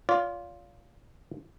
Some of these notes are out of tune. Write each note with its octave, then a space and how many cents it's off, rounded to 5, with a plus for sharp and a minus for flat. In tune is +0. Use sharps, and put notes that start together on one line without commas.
F4 +0 D5 -45